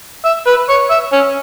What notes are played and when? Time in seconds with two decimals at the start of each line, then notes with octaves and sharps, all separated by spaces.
0.25 E5
0.47 B4
0.69 C#5
0.91 E5
1.13 C#4